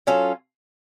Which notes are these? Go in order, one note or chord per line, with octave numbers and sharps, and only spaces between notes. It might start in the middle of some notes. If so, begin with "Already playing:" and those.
F#3 C#4 F4 A4